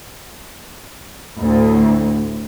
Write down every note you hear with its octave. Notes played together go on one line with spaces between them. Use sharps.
D2 A2